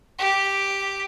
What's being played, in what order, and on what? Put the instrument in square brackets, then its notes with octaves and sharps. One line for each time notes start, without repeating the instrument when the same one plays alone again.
[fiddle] G4